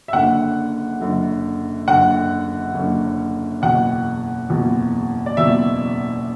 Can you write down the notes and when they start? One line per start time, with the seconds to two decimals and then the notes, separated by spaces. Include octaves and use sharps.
0.08 E5
0.13 F#1 F#2 D3 F#5
1.00 F#1 F#2 D3
1.88 F#1 F#2 D3 F#5
2.74 F#1 F#2 D3
3.62 F#1 E2 B2 F#5
4.50 F#1 E2 B2
5.26 D5
5.37 F#1 E2 B2 E5